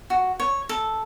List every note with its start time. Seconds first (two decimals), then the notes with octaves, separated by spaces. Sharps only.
0.10 F#4
0.40 C#5
0.69 A4